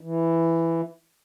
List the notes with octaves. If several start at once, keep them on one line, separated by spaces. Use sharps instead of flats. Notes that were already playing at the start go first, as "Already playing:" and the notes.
E3